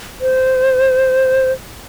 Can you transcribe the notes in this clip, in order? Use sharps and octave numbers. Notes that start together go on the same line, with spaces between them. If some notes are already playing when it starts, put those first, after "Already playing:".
C5